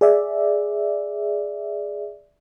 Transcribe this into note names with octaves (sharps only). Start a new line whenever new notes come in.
G#4 D5 E5